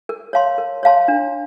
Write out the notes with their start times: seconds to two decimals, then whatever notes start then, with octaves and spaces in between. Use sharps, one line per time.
0.09 A#4
0.33 C#5 F5 A5 C6
0.58 A#4
0.83 C#5 F5 A5 C6
1.08 D4